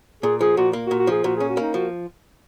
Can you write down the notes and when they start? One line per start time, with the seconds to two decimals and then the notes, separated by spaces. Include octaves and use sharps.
0.23 A#2 G#4
0.41 F3 G#4
0.57 A#2 F#4
0.73 A#3
0.87 F#4
0.91 A#2
0.99 F#4
1.07 F3 G#4
1.24 A#2 F#4
1.37 C#4 G#4
1.49 F#4
1.57 A#3 D#4
1.74 F3 F#4